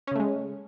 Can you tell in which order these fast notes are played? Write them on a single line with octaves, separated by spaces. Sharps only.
C#4 C#3 A3 G#3